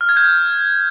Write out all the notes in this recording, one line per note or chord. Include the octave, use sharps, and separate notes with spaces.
F6
G#6
G6